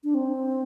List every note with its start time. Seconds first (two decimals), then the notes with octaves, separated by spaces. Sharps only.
0.04 D4
0.14 C4